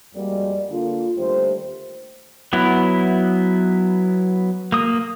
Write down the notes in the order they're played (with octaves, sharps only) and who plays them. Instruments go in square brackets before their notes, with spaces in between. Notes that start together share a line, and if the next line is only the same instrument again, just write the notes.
[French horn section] F2 G3 G#3 A#3 F#4 D5
D3 A#3 D4 F4
D#2 D3 G3 A3 C5
[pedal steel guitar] F#3 B3 E4
A#3 D#6